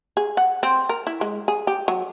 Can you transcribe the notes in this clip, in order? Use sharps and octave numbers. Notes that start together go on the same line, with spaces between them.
G#4
F#5
C4
A#4
E4
G#3
G#4
G4
F#3